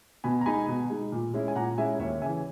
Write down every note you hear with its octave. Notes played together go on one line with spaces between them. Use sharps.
B2 G#5 B5
A#5
G#3 D#4 G#5 B5
B2
G#3 D#4
A#2
G#3 C#4 E4
G#5
A#2 F#5 A#5
G#3 C#4 E4 E5 G#5
D#2 C#5 E5
C#3 E3 E5 G#5